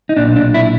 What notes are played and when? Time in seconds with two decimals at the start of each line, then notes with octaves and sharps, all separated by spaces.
0.09 D#4
0.17 B1 A#2 D4
0.36 D4
0.54 E4